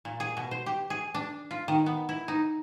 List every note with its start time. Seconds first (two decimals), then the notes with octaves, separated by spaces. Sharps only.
0.05 A#2
0.20 G#4
0.37 B2
0.51 C5
0.66 G4
0.90 G#4
1.14 D4
1.51 F4
1.68 D#3
1.86 B3
2.09 E4
2.28 D#4